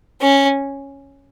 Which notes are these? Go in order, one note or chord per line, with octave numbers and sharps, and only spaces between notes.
C#4